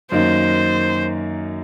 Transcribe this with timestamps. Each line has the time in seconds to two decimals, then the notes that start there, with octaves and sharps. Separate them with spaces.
0.12 F#2 D#3 A#3 D#4 C5